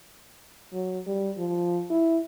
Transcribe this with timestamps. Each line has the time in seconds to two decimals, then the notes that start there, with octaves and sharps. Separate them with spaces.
0.73 F#3
1.06 G3
1.37 F3
1.90 E4